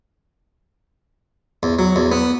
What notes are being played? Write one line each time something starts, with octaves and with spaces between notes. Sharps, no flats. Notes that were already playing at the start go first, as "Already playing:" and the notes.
E2
F#3
E2
B3